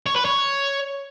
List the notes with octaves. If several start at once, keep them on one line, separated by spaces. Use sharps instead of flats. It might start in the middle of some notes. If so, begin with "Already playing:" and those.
C#5
B4
C#5